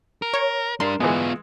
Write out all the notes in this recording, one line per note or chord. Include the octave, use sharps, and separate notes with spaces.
A#4
C#5
G3 D4 A#4 C6
E3 G#3 B3 F4